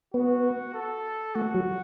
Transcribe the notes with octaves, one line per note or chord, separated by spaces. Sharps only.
B3 F#4
A4
A3 F#4
F#3